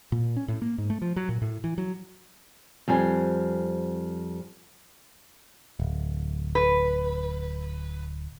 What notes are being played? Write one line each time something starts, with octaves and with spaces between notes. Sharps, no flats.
A#2
C#4
A2
A#3
G#2
A3
F3
F#3
A#2
A2
E3
F#3
F2 G3 C4 G#5
D1
B4